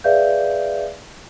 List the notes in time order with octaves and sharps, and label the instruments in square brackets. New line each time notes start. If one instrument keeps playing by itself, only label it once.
[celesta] G#4 B4 D5 E5 F5 G6